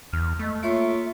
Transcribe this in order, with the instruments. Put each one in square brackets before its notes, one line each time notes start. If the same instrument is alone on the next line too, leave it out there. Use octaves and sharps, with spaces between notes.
[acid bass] E2 [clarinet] F6
[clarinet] G#3 [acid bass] A3
[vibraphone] A#3 C#5 C#6 [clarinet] F4 [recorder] E5